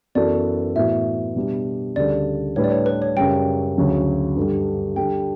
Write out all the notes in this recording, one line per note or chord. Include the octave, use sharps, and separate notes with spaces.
F#2 E3 B3 F#4 A4 D5
A2 E3 B3 F#4 E5
B2 G3 D4
D2 C#3 G3 D4 A4 D5
A2 G3 D4 G4 B4 C#5
D5
C#5
B4
C#5
F#2 C#3 G3 G5
D2 C#3 F#3 C#4
G2 D3 G3
D3 G3 D4 G5